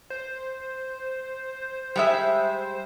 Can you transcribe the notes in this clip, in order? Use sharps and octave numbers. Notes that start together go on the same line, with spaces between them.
C5
G3 G#3 E5